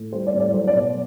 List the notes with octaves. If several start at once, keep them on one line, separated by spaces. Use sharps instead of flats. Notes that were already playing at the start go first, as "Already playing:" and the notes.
Already playing: A2
G3 C5
D5
A2
D5
F#3 C5
D5
B2